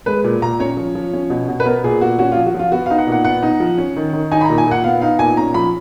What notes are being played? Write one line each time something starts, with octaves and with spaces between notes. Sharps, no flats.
G#3 B4
A#2
A#2 A#5
C#4 C#5
F3
F3
C#4
B2
B2
B4
B3 A#4
A#2 G#4
A#2 F#4
C#4 F#4
F4
F3
F#4
F3 F4
B3 F#4
F5
D#4
F#5
A#2
F#5
B3 F#5
D#4
F3
C#4
D#3
D#3
D#4 G#5
B5
A#5
A#2
G#5
A#2 F#5
B3 F5
D#4 F5
A#2 G#5
C#4 A#5
F3 B5